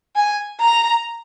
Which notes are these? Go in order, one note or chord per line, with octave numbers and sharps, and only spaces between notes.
G#5
A#5